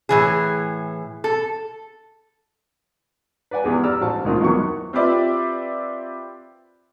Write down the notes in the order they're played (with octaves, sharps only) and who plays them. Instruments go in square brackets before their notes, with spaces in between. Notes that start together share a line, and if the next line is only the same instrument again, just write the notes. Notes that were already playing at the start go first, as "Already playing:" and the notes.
[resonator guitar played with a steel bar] A2 E3 G#4
A4
[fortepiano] B4 D5 F#5 G#5
E2 G4 G#4
D5 A#5 E6 F6
A1 F#4 C5 A5
D2 D#3 C4 F4
E2 D#3 F#3 C#6
[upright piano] C4 F4 G4 B4 D5 E5